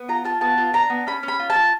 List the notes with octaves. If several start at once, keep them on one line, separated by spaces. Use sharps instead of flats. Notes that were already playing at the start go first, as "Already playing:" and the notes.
Already playing: B3
F4 A#5
F4 A5
B3 A5
F4
D4 A#5
B3
C#4 B5
C#4
B5
F4
A5
F4